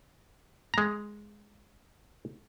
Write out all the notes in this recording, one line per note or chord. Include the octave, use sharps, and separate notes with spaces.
G#3 A#5